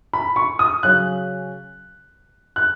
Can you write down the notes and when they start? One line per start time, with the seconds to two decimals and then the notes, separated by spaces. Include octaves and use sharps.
0.13 B5
0.36 C#6
0.59 D#6
0.83 C#3 F#3 C#4 F#6
2.56 F#6